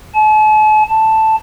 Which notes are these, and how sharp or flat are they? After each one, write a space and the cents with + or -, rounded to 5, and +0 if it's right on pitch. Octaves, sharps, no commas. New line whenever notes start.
A5 -45
A5 +0